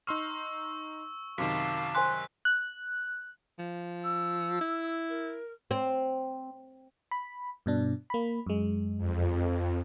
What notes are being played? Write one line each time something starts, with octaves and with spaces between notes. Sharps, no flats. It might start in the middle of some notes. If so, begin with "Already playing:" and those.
D#4 C6 C#6 E6 F6
F#2 C3 D#3 F#4 F5 A5 D6 B6
C5 G#5 C6 F#6 B6
F#6
F3
E6
E4
A#4
C4
B5
G2 B2 D4
A#3 B5
F#2 G#3
F2